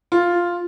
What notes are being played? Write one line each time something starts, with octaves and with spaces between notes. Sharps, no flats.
F4